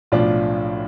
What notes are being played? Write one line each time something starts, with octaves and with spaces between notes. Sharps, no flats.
B1 A2 F3 D4 F4